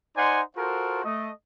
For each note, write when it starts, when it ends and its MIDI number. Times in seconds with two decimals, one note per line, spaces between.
0.17 0.41 63
0.17 0.41 72
0.17 0.41 74
0.17 0.41 78
0.17 0.41 80
0.17 0.41 84
0.57 1.03 65
0.57 1.03 66
0.57 1.03 69
0.57 1.03 70
0.57 1.03 72
1.04 1.31 57
1.04 1.31 75